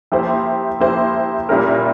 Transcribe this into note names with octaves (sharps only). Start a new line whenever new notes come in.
F3 A#3 E4 G4 C5
F3 A#3 E4 G4 C5
A#2 G3 C#4 E4 A#4